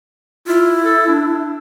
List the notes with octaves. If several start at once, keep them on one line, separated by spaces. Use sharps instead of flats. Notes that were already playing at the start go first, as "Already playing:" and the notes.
E4 F4
A4
D4